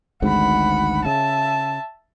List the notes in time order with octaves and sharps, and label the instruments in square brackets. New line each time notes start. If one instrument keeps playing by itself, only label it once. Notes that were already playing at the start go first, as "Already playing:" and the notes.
[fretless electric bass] G#1 D2 G#2 [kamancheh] F#5 B5
[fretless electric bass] C#3 [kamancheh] E5 A5